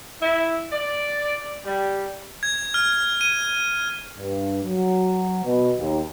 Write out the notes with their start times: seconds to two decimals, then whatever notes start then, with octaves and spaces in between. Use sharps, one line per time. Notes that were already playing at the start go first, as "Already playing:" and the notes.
0.22 E4
0.72 D5
1.65 G3
2.43 G#6
2.74 F6
3.21 D#7
4.17 G2
4.64 F#3
5.43 B2
5.78 D#2